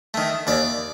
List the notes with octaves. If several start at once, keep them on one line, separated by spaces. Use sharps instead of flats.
D#3 A3
D#2 D5